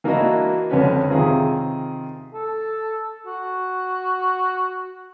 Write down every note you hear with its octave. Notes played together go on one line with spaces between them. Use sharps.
E3 A#3 D4 E4 F#4 D#5
F2 D3 C#4 B4
C3 D#3 F4 G#4 E5
A4
F#4